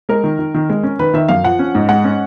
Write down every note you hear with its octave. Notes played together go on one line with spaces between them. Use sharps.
G#3 A#4
D#3
D#3
D#3
G#3
C#4
D#3 B4
D#3 E5
F#2 F5
F3 F#5
C#4
G#2
G#3 F#5
C#4